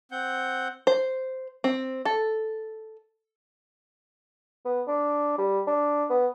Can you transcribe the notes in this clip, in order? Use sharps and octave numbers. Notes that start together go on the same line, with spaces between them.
C4 F#5 G6
C5
C4
A4
B3
D4
G3
D4
B3